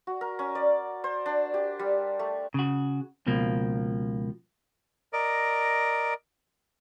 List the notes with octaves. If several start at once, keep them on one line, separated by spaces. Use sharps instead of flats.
F#4
A#4
C#4
D5
C5
D4
G4
G3
A3
C#3 F#4
C#2 B2 F3 A#3
A#4 D5 D#5